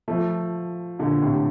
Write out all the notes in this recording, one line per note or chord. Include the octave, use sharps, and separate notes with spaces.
F3 A3
A#2 D3
A2 C3